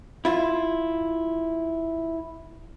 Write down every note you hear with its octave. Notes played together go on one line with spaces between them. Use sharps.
E4 F4